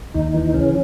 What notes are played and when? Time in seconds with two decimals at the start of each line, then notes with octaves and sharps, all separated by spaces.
0.14 D#2 D#4
0.34 E3
0.54 C#3 C#4